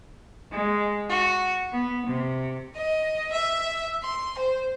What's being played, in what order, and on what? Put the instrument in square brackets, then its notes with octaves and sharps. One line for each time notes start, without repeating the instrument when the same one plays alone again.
[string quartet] G#3
F#4
B3
C3
D#5
E5
C6
C5